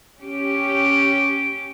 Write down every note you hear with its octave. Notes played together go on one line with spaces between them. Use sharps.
C#4 G4